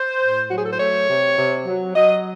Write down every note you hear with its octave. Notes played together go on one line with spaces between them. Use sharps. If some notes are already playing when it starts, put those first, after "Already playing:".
Already playing: C5
A2
F#3 F#4
G#4
A4
C5
A3 C#5
C3
C3
F#3
F#3 D#5